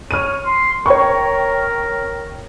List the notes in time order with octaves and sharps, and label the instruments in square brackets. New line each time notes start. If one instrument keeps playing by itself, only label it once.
[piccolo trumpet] C#5 [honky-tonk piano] F6 D#7
[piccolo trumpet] C6
[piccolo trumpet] A#4 [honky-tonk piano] C#5 G5 C#6